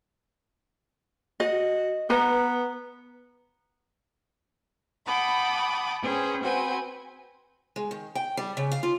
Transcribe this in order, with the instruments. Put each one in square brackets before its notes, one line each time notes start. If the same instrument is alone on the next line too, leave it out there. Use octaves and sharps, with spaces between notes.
[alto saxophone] F#4 [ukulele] D#5
[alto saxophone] B3 [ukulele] B4 A#5
[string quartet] F#5 G5 A5 B5 D6 D#6
C#4 G#4 B4 C5 G5
C4 F#4 B4 C5 G5 G#5
[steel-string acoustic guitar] G#3
D#3
G5
G3
C#3
F5
F4